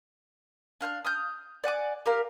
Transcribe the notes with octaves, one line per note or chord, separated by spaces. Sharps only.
D4 F5 G5 F6
D#6 F6 G6
D5 F#5 G#5 D6
G4 A#4 F5